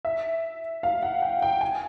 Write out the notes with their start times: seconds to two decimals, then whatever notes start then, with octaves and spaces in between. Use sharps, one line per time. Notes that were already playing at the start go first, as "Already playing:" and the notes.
0.05 E5
0.83 F5
1.03 F#5
1.22 G5
1.42 G5
1.61 G#5